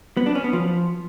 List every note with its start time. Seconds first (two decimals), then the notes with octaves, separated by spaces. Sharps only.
0.17 B3
0.26 D4
0.35 C#4
0.44 B3
0.53 F3